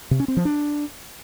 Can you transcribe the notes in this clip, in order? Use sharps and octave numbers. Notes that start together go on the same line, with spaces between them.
C3
C#4
C4
F3
D4